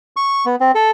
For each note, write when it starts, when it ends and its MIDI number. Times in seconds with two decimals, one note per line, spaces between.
0.17 0.45 85
0.46 0.56 59
0.61 0.71 60
0.75 0.91 69